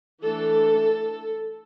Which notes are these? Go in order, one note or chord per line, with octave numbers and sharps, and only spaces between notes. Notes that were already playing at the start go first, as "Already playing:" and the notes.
E3 A3 D4 A4